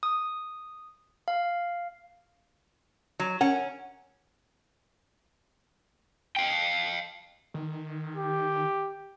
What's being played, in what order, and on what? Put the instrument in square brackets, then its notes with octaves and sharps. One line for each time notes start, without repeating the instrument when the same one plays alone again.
[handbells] D#6
F5
[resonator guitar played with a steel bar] F#3
[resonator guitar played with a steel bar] C#4 [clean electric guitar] A#4 F#5
[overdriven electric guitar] F5 G5
[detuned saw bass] D#3
[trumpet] G4